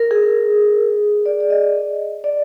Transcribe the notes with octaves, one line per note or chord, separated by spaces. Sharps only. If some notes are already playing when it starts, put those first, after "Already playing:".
Already playing: A#4
G#4
D5
D5
D#5
D5